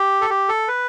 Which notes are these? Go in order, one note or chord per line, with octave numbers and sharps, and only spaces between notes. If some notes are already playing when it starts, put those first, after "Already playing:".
Already playing: G4
A4
G4
A4
B4